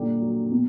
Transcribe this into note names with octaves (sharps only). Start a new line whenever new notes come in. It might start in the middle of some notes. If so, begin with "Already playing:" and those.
Already playing: A#2 D3 G3 G4
F#3
B2